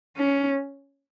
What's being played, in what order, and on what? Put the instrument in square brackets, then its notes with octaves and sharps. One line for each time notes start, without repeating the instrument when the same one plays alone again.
[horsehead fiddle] C#4